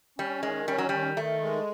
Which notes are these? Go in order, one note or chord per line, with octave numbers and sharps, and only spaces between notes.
G3 C#4
D#3 G#3
G3 C#4
F#3
D#3 G3
D#3 A3
G#3